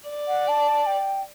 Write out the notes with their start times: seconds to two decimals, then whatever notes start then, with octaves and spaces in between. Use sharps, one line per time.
0.09 D5
0.28 F#5
0.48 A5
0.86 G5